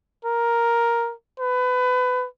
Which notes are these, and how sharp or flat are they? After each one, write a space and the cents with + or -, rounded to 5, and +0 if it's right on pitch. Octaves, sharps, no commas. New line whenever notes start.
A#4 +5
B4 +25